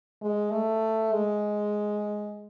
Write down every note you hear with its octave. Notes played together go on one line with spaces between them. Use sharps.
G#3
A3
G#3